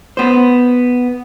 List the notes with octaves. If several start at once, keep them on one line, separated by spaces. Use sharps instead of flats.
B3 C5